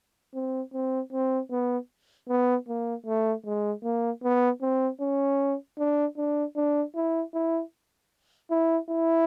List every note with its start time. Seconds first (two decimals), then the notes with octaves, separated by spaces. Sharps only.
0.34 C4
0.73 C4
1.13 C4
1.51 B3
2.29 B3
2.68 A#3
3.06 A3
3.45 G#3
3.84 A#3
4.23 B3
4.62 C4
5.01 C#4
5.79 D4
6.17 D4
6.56 D4
6.95 E4
7.34 E4
8.51 E4
8.89 E4